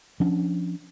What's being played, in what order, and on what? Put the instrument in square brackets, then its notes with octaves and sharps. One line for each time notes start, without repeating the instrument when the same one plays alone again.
[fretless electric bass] F3 C#4 D4